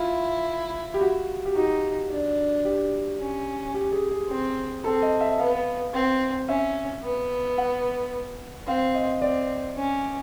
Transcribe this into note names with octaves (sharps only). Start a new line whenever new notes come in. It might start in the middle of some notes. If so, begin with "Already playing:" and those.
Already playing: E4 F4
G4
F#4
G4
D#4 F#4
D4
G4
C#4
G4
G#4
G#4
C4
C4 A4
D#5
E5
B3 F5
C4
C#4 E5
B3
F#5
C4 F5
D#5
C4 D5
C#4